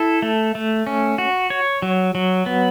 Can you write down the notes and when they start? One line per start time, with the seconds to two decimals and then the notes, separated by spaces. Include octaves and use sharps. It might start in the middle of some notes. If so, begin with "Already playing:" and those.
Already playing: E4 A4
0.22 A3
0.55 A3
0.87 C#4
1.18 F#4
1.50 C#5
1.82 F#3
2.15 F#3
2.46 B3